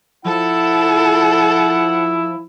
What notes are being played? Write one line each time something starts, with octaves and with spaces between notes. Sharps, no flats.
F3 E4 A4 F#5